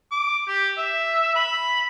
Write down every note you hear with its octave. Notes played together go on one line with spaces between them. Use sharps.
D6
G4
E5
B5